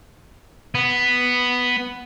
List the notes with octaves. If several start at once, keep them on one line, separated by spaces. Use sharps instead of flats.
B3